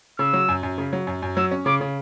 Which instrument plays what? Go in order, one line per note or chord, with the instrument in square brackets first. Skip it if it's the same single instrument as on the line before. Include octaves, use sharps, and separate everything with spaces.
[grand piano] C#3 [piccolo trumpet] E6
[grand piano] F#3
F#2
F#2
C#3
F#3
F#2
F#2
[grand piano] F#3 [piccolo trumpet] E6
[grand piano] C#4
[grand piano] C#3 [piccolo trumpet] D6
[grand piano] C#3